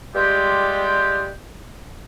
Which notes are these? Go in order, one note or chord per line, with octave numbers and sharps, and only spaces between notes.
G3 G#3 F4 G4